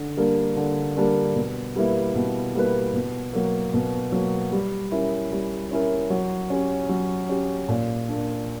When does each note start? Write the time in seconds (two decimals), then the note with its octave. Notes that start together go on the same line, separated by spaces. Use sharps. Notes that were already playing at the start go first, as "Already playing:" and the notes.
Already playing: D3
0.17 G3 A#3 D4 A#4
0.57 D3
0.97 G3 A#3 D4 A#4
1.35 B2
1.76 G3 A#3 E4 B4
2.15 B2
2.55 G3 A#3 E4 B4
2.94 B2
3.33 F#3 A#3
3.74 B2
4.12 F#3 A#3
4.52 G3
4.92 C#4 E4 A#4
5.32 G3
5.71 C#4 E4 A#4
6.10 F#3
6.50 C#4 G4
6.89 F#3
7.29 C#4 G4
7.68 A#2
8.08 A#3 D4